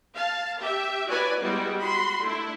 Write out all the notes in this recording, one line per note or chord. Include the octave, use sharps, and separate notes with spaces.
F5 A5
G4 E5
E4 F#4 B4 C#5 D5 G#5
G3 G#3 B3 E4 F#4
F#4 B5 C6
A3 D4 E4